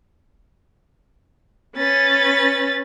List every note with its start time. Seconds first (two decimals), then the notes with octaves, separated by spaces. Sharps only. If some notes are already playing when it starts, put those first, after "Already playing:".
1.78 C#4 B4 A6